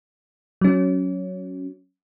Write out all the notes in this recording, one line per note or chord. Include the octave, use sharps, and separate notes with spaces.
F#3 C#4